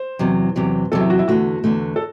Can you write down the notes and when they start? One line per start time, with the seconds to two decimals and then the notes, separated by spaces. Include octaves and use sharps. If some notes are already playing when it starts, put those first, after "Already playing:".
Already playing: C5
0.19 E2 C3 F#3
0.56 E2 C3 F#3
0.92 E2 C3 F#3 A4
1.01 E4
1.10 F#4
1.19 E4
1.28 E2 D3 A3 F#4
1.64 E2 D3 A3
1.96 A4